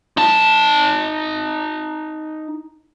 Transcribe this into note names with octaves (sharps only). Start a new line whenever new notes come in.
D#4 A5